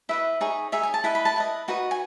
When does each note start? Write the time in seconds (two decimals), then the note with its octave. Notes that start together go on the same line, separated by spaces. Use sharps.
0.09 E4 B4 D#5 E5
0.41 D#4 G#4 C#5
0.72 D#4 G#4 C#5 E5
0.83 G#5
0.94 A5
1.04 E4 B4 D#5 B5
1.15 B5
1.25 A5
1.36 E4 B4 D#5
1.68 D#4 F#4 B4 D#5
1.91 G#5